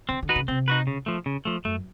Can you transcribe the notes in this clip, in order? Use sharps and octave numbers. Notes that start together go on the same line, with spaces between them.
D3 C4
D3
D#4 F#4 B4
C#3
C3 C4
D#4 F#4 B4
C#3
F3 A3
C#3
F3 A3
F#2 A3